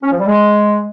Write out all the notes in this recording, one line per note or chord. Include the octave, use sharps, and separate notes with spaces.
C#4
F3
G3
G#3